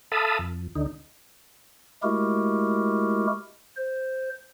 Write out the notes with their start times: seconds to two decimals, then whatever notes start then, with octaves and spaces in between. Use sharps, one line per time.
0.12 A4 E5 F5 A5 B5 D#6
0.39 F2
0.75 D2 D3 D#4
2.03 G#3 A3 E4 F#4 G4 A#4
3.76 C5